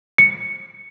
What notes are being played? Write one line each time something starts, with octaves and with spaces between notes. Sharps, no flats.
C#7